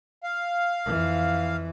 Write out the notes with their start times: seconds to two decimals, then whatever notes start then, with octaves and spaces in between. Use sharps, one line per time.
0.24 F5
0.85 F2 E3